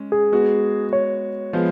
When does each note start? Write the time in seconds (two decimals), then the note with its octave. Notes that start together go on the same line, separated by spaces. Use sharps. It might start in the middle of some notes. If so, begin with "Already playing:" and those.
Already playing: G#3 C#4
0.12 G#4
0.32 G#3 B3 F#4
0.93 C#5
1.53 F3 G#3 B3 F4